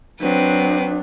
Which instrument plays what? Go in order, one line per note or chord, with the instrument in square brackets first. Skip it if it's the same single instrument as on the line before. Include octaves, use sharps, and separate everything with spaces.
[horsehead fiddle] F#3 D4 [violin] C4 B4